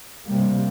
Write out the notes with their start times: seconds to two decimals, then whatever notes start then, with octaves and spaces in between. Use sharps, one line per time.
0.27 C3 G3 A#3